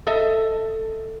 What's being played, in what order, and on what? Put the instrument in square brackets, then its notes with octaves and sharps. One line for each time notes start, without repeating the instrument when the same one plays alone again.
[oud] A4 D#5 E5